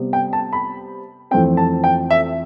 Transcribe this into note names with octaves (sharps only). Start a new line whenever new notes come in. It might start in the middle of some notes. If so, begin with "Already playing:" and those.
Already playing: C3 G3 B3
G5
A5
B5
F2 E3 A3 C4 G5
A5
G5
E5